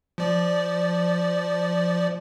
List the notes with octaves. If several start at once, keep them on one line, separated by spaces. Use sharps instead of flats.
F3 D5